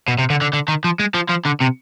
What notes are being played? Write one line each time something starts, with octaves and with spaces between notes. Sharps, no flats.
B2
C3
D3
D3
D3
D#3
F3
G#3
F3
F3
D3
C3